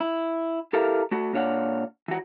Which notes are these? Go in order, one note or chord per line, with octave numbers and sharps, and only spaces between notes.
E4
E4 G4 A4 A#4 E5 F5
A3 F#4
A#2 D4 C#5 F5 F#5
E3 F#4